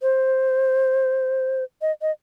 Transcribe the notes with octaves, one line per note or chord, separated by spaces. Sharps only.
C5
D#5
D#5